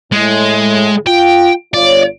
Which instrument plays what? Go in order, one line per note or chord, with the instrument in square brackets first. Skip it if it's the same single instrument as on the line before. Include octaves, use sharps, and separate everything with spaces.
[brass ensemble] A2 [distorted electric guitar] G#3
[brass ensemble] F4 [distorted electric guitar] G5
[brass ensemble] G1 F4 C#5 [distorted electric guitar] D5